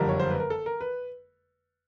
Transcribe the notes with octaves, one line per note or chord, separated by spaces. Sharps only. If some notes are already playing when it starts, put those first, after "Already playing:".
Already playing: F#1 F2 D3 G3 A#4
C#5
C5
B4
A#4
A4
A#4
B4